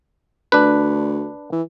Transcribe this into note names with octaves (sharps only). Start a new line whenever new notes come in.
D2 D4 B4
E3